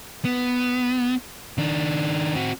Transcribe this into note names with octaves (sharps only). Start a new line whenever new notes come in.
B3
D#3 D4
C4 F#4